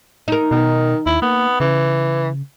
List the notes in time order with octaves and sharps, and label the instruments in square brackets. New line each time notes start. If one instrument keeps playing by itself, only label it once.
[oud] D#4 A#4
[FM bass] B2 [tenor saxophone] D#3
[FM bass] D#2 [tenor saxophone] E4
[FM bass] A#3 [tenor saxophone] B3
[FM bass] C#3 [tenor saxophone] E3